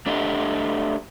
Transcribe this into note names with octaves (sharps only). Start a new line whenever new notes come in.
A3 D4 G4 D#5